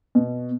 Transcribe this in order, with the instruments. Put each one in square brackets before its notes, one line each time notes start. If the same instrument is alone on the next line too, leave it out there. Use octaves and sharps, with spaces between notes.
[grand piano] B2